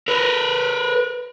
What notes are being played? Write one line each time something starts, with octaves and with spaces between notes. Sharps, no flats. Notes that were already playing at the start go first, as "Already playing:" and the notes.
A#4 B4